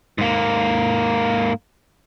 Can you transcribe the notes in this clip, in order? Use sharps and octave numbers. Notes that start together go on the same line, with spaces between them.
G#2 A#3